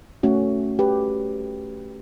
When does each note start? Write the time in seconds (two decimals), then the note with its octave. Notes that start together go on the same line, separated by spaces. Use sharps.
0.23 A3 C#4 F#4
0.79 G4 B4